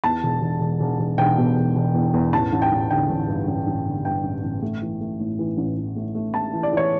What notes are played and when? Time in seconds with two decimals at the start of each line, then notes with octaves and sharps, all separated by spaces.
0.04 E2 A5
0.23 E1
0.42 E1
0.60 E1
0.80 E1
0.99 E1
1.18 E1 G5
1.38 B2
1.57 E1
1.76 E1
1.94 E2
2.14 E2
2.33 A1 A5
2.53 A1
2.62 G5
2.72 A1
2.90 D3 G5
3.10 A1
3.29 G2
3.48 A1
3.67 A1
3.86 D3
4.05 G2 G5
4.24 A1
4.44 A1
4.62 A3
4.82 E3
5.01 A3
5.20 A2
5.39 E3
5.57 A1
5.77 E3
5.96 A3
6.15 A3
6.34 A3 A5
6.53 E3
6.63 D5
6.73 E3 C#5